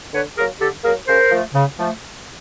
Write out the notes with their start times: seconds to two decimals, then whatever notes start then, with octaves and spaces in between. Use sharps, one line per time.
0.13 D3 B4 C#5
0.37 F#3 A#3 G#4 A#4
0.60 D3 G4 A4
0.84 F#3 A#3 G#4 A#4
1.07 C#3 A#4 C5
1.31 F3 A3
1.54 C#3
1.78 F3 A3